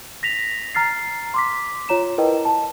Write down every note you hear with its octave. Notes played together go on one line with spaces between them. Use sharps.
A#6 B6 F7
A#5 F6 A6 C7
C6 D6 B6
F4 C#5 A#5 E7
E4 A#4 B4 D#5 G5
A5